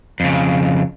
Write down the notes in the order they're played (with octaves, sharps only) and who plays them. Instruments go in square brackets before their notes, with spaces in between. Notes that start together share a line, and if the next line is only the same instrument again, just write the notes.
[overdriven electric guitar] F2 C#3